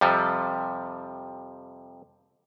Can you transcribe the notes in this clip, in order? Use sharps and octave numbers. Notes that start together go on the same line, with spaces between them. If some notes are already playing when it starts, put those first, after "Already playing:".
F2 C3 F3 G3